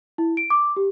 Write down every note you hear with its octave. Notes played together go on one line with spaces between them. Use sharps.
E4
D7
D6
G4